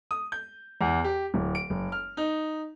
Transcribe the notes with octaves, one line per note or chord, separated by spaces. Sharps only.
D#6
G6
E2
G4
D1
D7
F#1
F6
D#4